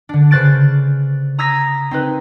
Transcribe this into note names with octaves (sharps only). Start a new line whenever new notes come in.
D3 D4
C#3 B4 C5 F#6 A6 D7
A#5 D#6 E6 G#6 A#6 B6
C4 D#4 B4